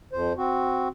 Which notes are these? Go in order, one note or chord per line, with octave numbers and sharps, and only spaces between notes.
F2 C5
C4 F#4